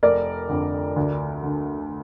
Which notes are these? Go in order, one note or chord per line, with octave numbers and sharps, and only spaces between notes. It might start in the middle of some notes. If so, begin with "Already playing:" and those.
F1 A#4 D5
F2 D3
D2
D3